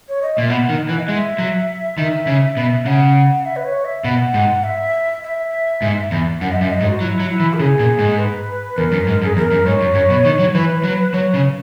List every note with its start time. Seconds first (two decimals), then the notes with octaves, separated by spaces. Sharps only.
0.09 C#5
0.22 D#5
0.36 A#2 E5
0.50 B2 F#5
0.69 D#3
0.89 E3
0.99 D#5
1.08 G#3 E5
1.39 F#3
1.98 D#3
2.27 C#3
2.57 B2
2.86 C#3 F#5
3.46 E5
3.56 B4
3.65 C#5
3.85 E5
4.04 B2 F#5
4.34 G#2
4.64 E5
5.23 E5
5.82 G#2
6.11 E2
6.41 F#2 F#5
6.52 D#5
6.56 E5
6.61 F#2
6.70 D#5
6.81 G#2
6.85 F#4
7.00 F#3 E4
7.20 F#3
7.30 E4
7.40 E3
7.54 A#4
7.59 C#3 G#4
7.79 A#2
7.99 G#2
8.18 B4
8.77 E2 A#4
8.92 F#2
9.07 G#2
9.22 F#2
9.25 G#4
9.36 E2 A#4
9.51 F#2
9.66 G#2 C#5
9.81 F#2
9.95 F#2
10.10 B2
10.25 D#3
10.39 F#3
10.55 E3 B4
10.83 F#3
11.13 F#3 C#5
11.34 C#3